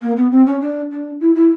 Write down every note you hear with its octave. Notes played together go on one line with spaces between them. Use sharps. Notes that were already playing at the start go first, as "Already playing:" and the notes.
A#3
B3
C4
C#4
D4
D4
E4
E4